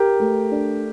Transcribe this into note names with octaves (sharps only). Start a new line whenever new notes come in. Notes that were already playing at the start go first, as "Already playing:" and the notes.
Already playing: G4 A#4
A3
D4